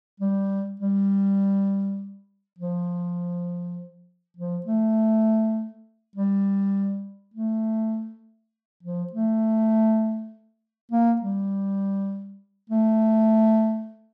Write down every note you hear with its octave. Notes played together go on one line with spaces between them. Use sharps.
G3
G3
F3
F3
A3
G3
A3
F3
A3
A#3
G3
A3